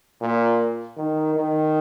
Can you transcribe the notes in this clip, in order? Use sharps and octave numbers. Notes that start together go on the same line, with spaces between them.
A#2
D#3
D#3